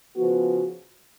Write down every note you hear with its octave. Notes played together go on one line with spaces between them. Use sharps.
C#3 F3 B3 F#4